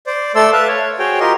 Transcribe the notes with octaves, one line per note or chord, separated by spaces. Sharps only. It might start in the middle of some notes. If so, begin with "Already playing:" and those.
C5 D5
A3 A4 D5 C6 E6
B4 E5 F5 A5
C#5
F#4 G#4 C5 C#5 G5
F4 G4 A#4 D#5 C6